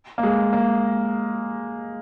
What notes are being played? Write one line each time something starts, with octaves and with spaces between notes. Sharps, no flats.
A#3
G#3
A#3